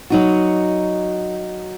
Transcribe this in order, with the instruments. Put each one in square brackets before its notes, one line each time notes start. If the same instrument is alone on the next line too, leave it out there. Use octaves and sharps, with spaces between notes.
[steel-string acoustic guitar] F#3 D#4 F#4